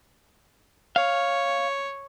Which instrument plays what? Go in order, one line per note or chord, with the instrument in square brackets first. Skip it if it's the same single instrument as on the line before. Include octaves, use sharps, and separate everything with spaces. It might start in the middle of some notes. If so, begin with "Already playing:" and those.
[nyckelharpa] C#5 [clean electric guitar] F5